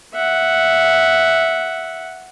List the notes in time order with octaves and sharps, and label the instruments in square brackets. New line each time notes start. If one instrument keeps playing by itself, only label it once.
[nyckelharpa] E5 F#5